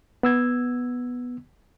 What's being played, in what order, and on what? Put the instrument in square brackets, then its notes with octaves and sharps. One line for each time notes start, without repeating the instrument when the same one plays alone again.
[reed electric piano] B3 E6 G#6